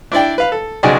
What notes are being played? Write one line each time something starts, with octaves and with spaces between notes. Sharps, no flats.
D4 E4 D5 G5
B4 F5
A4
B1 C#3 F#4 G#4 D5 D#5